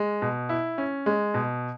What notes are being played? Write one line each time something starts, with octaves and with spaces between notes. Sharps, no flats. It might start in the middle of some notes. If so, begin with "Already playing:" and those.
Already playing: G#3
B2
E4
C#4
G#3
B2